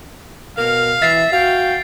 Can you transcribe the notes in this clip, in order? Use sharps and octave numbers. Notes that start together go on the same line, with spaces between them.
B2 A#4 F5
E3 E5 A6 C7
F#4 F5 G5